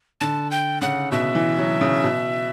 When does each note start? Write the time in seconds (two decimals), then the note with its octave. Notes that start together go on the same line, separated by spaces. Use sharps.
0.21 D3 A5
0.51 G5
0.81 C#3 F#5
1.12 B2 E5
1.35 E3
1.58 F#3
1.81 C#3
2.04 B2